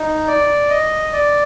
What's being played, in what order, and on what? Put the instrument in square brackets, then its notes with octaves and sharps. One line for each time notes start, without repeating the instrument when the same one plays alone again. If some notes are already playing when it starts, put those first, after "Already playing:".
Already playing: [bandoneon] D#4
D5
D#5
D5